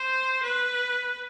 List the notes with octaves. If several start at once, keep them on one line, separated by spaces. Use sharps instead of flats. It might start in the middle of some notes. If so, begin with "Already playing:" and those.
Already playing: C5
B4